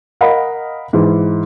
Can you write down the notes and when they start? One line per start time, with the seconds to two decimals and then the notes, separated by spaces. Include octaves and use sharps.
0.21 A#4 D#5 F5 F#5 B5
0.93 G#2 E3